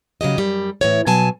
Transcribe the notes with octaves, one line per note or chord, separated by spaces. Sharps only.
C#3 F#3 G4 D#5
F#2 G3
A2 E3 C#5
B2 F#3 G#5 A5